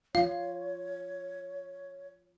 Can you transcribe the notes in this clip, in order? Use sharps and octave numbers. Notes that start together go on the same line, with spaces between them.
F3 F4 C#5 F5